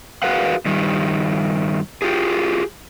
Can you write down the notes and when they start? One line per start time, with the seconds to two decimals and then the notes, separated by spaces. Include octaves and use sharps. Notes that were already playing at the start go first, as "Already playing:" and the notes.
0.23 F#4 G#4 A#4 B4 F5 F#5
0.66 G2 D#3 G3
2.02 F4 G4 G#4